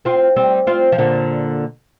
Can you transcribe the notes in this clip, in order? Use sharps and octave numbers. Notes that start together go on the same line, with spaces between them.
C4 F4
G3 C4
C4 F4
F3
A#2 D3